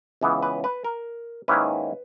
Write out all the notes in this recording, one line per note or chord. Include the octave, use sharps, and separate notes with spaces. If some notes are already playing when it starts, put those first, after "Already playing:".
C#2 C#3 E3 B3
B4
B4
A#4
G#2 D#3 A#3 C#4 E4 B4